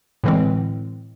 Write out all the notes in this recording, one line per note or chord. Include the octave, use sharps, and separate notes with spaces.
A2 D3 E3 G#3 C4